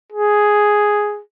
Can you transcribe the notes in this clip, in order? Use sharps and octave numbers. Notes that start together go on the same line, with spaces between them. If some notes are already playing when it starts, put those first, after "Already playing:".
G#4